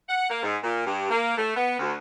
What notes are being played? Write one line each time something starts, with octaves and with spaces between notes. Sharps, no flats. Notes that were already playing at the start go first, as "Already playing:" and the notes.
F#5
A#3
G#2
A#2
G2
A#3
A3
B3
D2